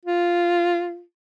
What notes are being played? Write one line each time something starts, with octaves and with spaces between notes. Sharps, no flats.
F4